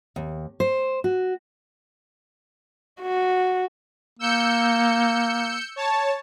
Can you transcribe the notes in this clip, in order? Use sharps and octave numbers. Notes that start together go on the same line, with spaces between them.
D#2
C5
F#4
F#4
A#3 E6 G6 C#7
C#5 A5